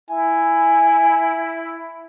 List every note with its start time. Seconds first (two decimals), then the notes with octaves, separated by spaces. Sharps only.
0.10 E4 G#5